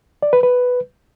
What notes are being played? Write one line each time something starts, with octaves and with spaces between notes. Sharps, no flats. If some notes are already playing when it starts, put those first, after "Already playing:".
D5
B4
B4